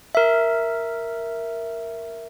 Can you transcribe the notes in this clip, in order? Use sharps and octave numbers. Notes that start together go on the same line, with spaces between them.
A#4 E5